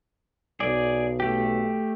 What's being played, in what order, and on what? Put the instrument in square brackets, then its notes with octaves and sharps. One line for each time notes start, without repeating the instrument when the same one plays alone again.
[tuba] B1 [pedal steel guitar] G#4 D5
[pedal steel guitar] A3 G4